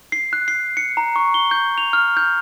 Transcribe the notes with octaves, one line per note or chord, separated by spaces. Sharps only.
C7
F#6
C7
C#7
A#5
C#6
G7
G6
F7
F6
G6